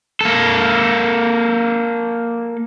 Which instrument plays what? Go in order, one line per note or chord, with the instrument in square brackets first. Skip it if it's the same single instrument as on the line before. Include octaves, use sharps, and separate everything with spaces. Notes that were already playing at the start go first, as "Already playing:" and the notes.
[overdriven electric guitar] A#3 A4